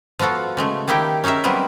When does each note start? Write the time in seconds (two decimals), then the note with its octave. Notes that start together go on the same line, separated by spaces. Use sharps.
0.19 F3 B3 F4 F#4 A4
0.57 C#3 G#3 A3
0.88 D#3 A#3 D#4 E4 G4 G5
1.24 C#4 D#4 G#4 A#4 E5
1.44 F#3 G3 B3 C4 A#4 D#5